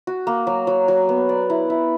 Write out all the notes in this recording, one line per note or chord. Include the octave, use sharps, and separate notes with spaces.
F#4
A#3
F#3
F#3
F#3
B3
D5
E4
E4